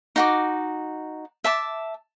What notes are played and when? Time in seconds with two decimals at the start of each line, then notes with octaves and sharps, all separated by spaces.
0.16 D#4 F#4 D6
1.44 E5 A5 D6